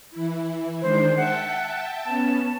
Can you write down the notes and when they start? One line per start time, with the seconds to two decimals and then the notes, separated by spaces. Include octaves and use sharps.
0.11 E3 E4
0.82 D#3 G#3 D4 C5
1.17 E5 F#5 G5 A5
2.05 B3 C#4 A5